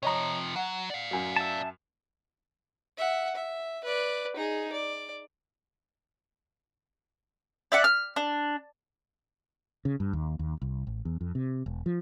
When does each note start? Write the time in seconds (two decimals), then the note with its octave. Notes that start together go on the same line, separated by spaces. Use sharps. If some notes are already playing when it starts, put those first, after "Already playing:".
0.03 C3 F3 C#5 D#5 A#5
0.56 F#3 F#5
0.90 D5 F5
1.11 F#2 F#3
1.36 E5 A5
2.98 E5 F#5
3.35 E5
3.84 B4 D5
4.36 D#4 G#4
4.73 D5
7.72 D5 E5 F#5
7.84 F6
8.16 D4
9.85 C#3
10.00 G2
10.13 D#2
10.39 D#2
10.62 C2
10.87 A1
11.05 E2
11.21 F2
11.35 C3
11.66 E1
11.86 F3